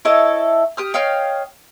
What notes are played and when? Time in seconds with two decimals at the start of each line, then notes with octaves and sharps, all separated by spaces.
0.05 E4 A4 C#5 D#5
0.77 G4 D#6 F6
0.94 C#5 D#5 F5 G5